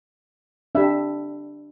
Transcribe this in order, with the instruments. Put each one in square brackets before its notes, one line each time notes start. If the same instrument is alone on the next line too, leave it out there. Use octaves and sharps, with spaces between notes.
[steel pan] D4 G4 E5